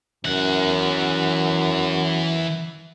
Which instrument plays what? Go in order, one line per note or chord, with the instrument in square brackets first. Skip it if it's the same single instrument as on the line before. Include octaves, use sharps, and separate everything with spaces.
[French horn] F#2 [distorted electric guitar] E3 F#5